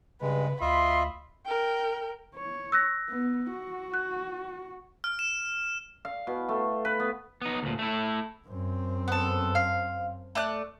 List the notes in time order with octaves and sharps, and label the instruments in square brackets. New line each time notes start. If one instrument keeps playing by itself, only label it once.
[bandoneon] G2 G#3 [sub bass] C#3 [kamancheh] B4
[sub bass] D2 [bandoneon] F4 D#5 E5 [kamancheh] B5 [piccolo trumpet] C6
[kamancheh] A#4 G5
[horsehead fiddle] C#5
[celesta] E6 F#6 A#6
[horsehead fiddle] B3
F#4
[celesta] F#6
[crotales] F6
E7
[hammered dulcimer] F5
B2
A3
B4
B3
[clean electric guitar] B3 D#4
D2 A#2
A3 E4
[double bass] F#2 C4
[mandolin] B3 A4
F5
A3 D5 F#6